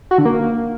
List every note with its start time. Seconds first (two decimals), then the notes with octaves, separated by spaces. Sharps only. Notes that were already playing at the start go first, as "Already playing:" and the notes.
0.11 F#4
0.18 D3
0.25 A#3